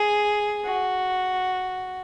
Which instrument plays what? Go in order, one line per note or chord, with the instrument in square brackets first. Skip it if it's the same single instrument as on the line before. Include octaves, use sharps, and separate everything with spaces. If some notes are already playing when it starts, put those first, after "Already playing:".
Already playing: [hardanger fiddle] G#4
F#4